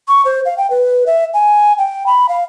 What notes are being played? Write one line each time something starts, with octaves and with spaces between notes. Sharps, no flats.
C#6
C5
F5
G5
B4
E5
G#5
G5
B5
F5